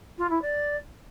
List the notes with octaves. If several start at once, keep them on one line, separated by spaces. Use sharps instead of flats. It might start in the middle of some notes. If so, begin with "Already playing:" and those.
F4
E4
D5